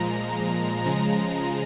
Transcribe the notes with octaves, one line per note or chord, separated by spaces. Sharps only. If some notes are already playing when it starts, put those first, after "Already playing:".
Already playing: A#2 F3 G#3 A#5
C#3 F3 G#3 A#5